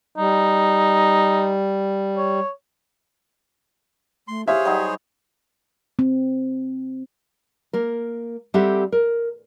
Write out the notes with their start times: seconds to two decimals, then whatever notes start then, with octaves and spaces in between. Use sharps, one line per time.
0.18 G3 D#4
2.17 C#5
4.28 A3 C6
4.48 G4 G#4 C5 C#5 E5 F5
4.65 F#3 G3 D#4
5.99 C4
7.73 A#3 A#4
8.54 G3 C4 G4 A4 E5 F#5
8.92 A#4